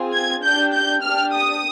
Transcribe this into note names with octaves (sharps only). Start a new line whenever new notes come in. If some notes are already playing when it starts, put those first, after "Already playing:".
Already playing: C4 F4 G#4
G#6
D4 G4 G6
G6
D4 G4 F6
D#6